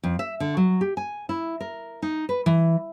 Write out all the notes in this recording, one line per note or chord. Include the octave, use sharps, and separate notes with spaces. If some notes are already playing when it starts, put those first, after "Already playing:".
F2
E5
D3
F#3
G4
G#5
E4
A#4
D#4
B4
E3